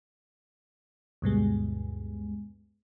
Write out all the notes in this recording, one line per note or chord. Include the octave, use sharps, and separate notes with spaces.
D2 G2 B2 G#3